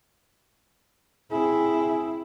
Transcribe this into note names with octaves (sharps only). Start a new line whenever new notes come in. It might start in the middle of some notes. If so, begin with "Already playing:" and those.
C4 E4 G#4